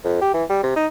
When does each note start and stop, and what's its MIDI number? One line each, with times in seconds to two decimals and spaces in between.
0.05 0.20 41
0.22 0.33 67
0.34 0.44 52
0.50 0.59 55
0.64 0.72 48
0.76 0.87 63